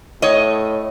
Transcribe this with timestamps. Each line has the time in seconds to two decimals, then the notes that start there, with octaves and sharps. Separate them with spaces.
0.22 A2 C#5 D#5